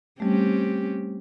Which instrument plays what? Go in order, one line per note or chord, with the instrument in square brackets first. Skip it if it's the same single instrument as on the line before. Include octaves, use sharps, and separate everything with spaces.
[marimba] G3 A3 [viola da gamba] C4 C#4 G4